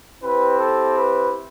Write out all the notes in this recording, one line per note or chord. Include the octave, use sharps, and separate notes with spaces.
C4 E4 G4 B4
A4
B4